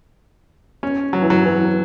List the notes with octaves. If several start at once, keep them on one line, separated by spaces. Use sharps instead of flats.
C#4
F#3
E3
F#3
E3